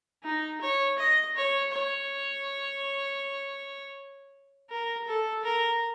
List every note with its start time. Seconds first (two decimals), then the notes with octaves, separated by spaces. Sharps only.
0.23 D#4
0.61 C#5
0.98 D#5
1.36 C#5
1.73 C#5
4.70 A#4
5.07 A4
5.45 A#4